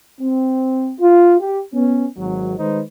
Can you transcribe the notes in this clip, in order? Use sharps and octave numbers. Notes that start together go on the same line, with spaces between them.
C4
F4
G4
B3 C#4
G#1 F#3
D#3 G#3 D#4 B4 C5